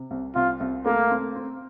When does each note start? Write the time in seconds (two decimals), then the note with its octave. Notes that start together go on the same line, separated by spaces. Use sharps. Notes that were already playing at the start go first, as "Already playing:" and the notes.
Already playing: C3
0.11 C2
0.35 C2 F4
0.60 C2
0.86 A3 A#3
1.11 C4
1.35 C4